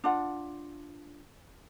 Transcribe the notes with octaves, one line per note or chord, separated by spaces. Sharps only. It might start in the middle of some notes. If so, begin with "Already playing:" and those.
D4 F4 F#5